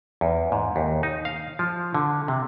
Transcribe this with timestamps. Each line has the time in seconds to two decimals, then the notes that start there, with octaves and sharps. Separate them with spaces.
0.21 E2
0.52 G#2
0.76 D#2
1.03 D#4
1.25 F5
1.59 F3
1.94 D3
2.28 C3